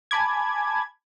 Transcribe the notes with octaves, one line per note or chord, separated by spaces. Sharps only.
G#5 A5 B5 D6 G#6